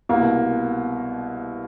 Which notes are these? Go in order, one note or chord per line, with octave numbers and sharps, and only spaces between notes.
C2 B2 A#3